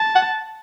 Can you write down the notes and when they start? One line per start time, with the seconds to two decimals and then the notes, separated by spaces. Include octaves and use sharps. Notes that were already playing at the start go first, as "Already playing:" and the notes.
Already playing: A5
0.15 F#5